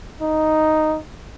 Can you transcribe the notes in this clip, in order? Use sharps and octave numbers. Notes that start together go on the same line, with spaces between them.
D#4